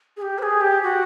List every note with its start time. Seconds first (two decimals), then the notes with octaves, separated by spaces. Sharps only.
0.17 G#4
0.22 G4
0.39 C5
0.42 G#4
0.61 G4
0.83 F#4